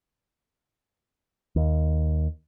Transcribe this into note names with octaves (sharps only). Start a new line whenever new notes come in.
D#2